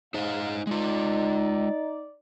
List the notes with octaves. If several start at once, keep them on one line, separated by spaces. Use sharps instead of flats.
C#2 G#2 D#4 C5 D#5 F5
G#3 D#4 F4 D5